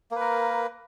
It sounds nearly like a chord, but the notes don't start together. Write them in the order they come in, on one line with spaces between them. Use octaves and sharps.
A#3 B4 A#4